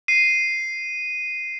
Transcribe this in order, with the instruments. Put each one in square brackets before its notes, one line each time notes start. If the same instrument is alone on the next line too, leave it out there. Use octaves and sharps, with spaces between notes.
[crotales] C7 D#7